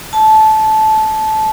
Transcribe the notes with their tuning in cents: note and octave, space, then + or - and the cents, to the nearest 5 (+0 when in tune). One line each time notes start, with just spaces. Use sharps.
A5 -15